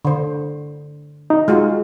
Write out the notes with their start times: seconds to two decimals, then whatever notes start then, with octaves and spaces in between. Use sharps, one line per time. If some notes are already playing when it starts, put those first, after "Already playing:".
0.05 D3 C5
1.30 D#4
1.48 G#3 F4 F#4